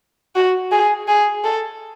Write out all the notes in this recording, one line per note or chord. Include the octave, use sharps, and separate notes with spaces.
F#4
G#4
G#4
A4